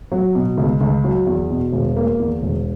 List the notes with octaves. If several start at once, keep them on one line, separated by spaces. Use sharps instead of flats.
F#3
B2
C#2
C#2
F#3
E2
B2
E1
A#3
E2
E1